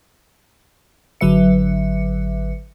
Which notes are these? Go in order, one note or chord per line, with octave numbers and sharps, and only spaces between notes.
G#1 D3 F#3 B4 E5 C#7